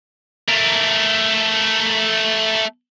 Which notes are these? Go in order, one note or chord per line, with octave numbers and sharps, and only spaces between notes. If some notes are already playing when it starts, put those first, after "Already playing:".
A3 A#4